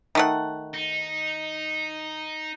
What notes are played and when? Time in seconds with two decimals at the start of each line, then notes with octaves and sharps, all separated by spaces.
0.15 D#3 A3 F#5
0.74 D#4